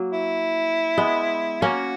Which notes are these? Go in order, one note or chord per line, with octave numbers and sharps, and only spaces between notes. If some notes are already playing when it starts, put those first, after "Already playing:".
Already playing: F#3 A#3
E4
G#3 B3
A#3 C#4 F#4